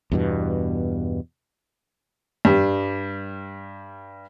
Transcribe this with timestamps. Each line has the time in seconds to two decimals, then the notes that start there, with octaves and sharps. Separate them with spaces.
0.12 E2 G2 B2
2.45 G2 G3